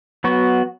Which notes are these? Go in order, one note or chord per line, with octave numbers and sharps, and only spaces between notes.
F#3 B3 F#4